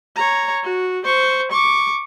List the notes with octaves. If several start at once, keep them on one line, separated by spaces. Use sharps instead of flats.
C#5 A#5
F#4
C5 C#6
C#6 D6